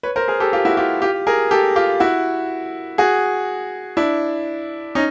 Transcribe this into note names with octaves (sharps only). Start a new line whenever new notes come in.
B4 C#5
A#4 C5
G#4 A#4
G4 A4
F4 G4
E4 F#4
F4 G4
F4 G4
G#4 A#4
G4 A4
F4 G4
E4 F#4
F#4 G#4
D4 E4
C#4 D#4